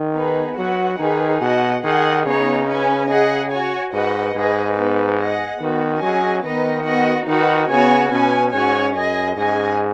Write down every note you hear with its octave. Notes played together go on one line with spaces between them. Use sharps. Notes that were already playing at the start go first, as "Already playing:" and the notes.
Already playing: D#3
B3 D#4 G#4 B4
F#3 F#4 B4 F#5
D#3 D#4 G#4 B4
B2 F#4 D#5 F#5
D#3 G#4 D#5 F#5
C#3 B3 D#4 G#4 C#5
C#4 B4 G#5
G#4 D#5 F#5
F#4 C#5 G#5
G#2 F#4 B4 D#5 F#5
G#2 G#4 B4 D#5
B3 D#4 B4
G#4 D#5 F#5
D#3 B3 F#4 B4
F#3 C#4 G#4 D#5 G#5
D#3 B3 D#4 B4 D#5
B3 F#4 D#5 F#5
D#3 D#4 F#4 B4 F#5
C#3 B3 F#4 C#5 G#5
B2 C#4 B4 G#5
G#2 C#4 F#4 C#5 G#5
F#2 G#4 D#5 G#5
G#2 C#4 G#4 D#5 G#5